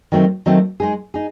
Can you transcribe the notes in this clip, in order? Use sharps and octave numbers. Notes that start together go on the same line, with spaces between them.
D#3 F#3 A3 C4
D#3 F#3 A3 C4
G#3 D#4 G#4
D#4 G#4